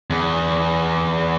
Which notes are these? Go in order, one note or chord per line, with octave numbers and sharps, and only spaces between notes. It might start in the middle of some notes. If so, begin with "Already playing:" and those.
E2